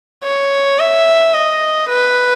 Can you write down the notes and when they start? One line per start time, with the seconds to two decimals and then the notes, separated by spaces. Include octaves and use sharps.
0.24 C#5
0.80 E5
1.34 D#5
1.88 B4